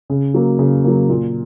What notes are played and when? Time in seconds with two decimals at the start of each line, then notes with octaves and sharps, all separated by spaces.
0.10 C#3
0.34 F#3 A#3
0.59 C#3
0.84 F#3 A#3
1.09 A#2